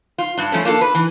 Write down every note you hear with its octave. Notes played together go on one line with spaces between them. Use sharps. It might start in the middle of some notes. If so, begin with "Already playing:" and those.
F4
G2 D4
F3 A3 C#4
A#3 D4 F4 A4
B4
E3